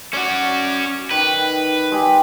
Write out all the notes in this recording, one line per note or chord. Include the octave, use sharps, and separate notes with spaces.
C#4 F#4 D5
D#3 B4
G#3 G4